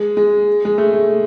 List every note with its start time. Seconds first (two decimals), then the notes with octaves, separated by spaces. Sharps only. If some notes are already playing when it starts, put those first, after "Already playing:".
Already playing: G#3
0.17 G#3
0.65 G#3
0.78 A3
0.93 A3